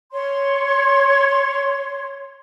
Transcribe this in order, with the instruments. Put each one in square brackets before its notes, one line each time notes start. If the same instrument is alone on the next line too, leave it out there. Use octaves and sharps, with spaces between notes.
[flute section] C#5 C6